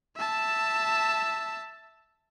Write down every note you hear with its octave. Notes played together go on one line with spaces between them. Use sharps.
E5 A5